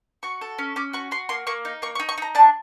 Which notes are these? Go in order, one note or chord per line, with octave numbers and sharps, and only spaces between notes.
F#4 C#6
A4
C#4
C#4 D6
F#4 C#6
F#4 C6
A#3 C6
A#3 C#6
D#4
A#3 C#6
C#6
D#4
C#6
D#4 A#5
D4 A5